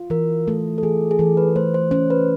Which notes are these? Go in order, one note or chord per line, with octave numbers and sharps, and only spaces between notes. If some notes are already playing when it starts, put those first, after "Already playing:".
Already playing: F4
E3 A#4
A3 A4
A4
E3 G#4
G#4
E3 A4
B4
A3 C5
C5
C#4 C5
B4